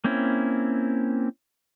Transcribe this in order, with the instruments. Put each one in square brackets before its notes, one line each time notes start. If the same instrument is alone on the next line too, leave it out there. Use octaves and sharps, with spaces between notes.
[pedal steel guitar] A#3 C4 C#4 E4